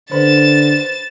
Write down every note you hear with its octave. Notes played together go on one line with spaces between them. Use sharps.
D3 B4 C5 B5 A6 E7